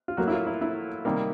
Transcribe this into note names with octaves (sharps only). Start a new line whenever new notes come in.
F4
A2 F#3 A#3 F#4
E4
F4
E4
E4
C3 D#3 G3 A#3